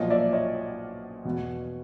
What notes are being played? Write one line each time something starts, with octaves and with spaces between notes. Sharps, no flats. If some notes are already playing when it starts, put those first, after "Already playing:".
Already playing: B1 A#2 F3 C#5 D#5
D5 E5
C#5 D#5
E2 B2